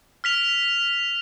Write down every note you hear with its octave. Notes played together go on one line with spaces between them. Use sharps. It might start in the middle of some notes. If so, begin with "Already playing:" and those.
F6 B6 F7